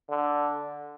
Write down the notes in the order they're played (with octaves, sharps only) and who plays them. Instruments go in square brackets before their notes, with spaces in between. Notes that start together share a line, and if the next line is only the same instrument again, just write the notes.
[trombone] D3